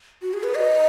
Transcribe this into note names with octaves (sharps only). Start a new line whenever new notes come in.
F#4
G#4
B4
D#5